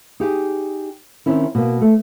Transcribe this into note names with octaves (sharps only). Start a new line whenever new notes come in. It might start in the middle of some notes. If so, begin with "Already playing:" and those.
D#4 G4 G#4
D#3 C4 C#4 E4
B2 A#3
A3